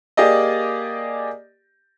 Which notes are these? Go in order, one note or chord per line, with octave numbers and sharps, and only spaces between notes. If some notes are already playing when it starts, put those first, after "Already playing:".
A#3 G4 G#4 D5 D#5